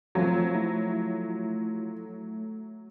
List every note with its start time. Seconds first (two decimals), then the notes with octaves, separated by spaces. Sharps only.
0.15 F3 F#3 A3 C4 F4
0.55 A3 E4